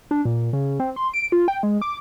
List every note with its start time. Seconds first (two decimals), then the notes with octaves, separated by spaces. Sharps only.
0.11 D4
0.25 A#2
0.53 C#3
0.80 C4
0.96 C6
1.14 D7
1.32 F4
1.48 G5
1.63 G#3
1.82 D6